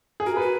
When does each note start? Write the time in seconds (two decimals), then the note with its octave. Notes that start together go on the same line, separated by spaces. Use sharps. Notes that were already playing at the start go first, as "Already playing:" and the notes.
0.20 G#4
0.26 F#4 A#4
0.36 B4
0.42 F#4